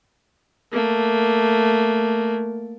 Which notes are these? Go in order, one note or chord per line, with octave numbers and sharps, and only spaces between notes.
A3 A#3